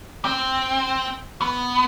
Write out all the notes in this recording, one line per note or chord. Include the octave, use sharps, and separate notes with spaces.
C4
B3